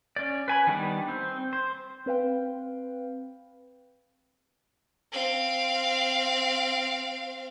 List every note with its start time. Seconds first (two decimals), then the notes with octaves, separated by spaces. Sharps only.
0.16 C#4 D5
0.48 B4 G#5 B5
0.67 D#3 G3 B3 D4
1.09 C4
1.53 C5
2.06 C4 B4 F5 G5
5.12 C4 F5